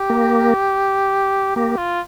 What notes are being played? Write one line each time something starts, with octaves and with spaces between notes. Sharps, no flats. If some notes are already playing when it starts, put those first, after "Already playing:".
Already playing: G4
A#3
A#3 G4
F4